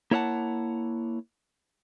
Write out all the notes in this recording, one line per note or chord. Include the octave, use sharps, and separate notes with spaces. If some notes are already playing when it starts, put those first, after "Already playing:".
A#3 E4 C#5 E5 F#5 A5